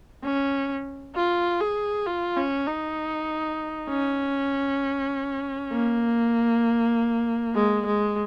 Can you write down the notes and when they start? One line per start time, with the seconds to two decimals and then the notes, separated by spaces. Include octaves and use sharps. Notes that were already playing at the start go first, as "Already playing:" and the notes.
0.23 C#4
1.15 F4
1.61 G#4
2.06 F4
2.37 C#4
2.67 D#4
3.89 C#4
5.72 A#3
7.55 G#3
7.86 G#3